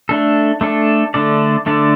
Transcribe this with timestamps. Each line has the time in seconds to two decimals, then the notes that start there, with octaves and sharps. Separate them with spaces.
0.09 A3 D4 A4
0.61 A3 D4 A4
1.14 D3 A3 D4 A4 D5
1.66 D3 A3 D4 A4 D5